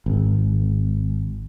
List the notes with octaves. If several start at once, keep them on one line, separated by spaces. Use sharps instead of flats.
G#1